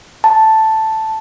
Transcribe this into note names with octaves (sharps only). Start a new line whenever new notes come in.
A5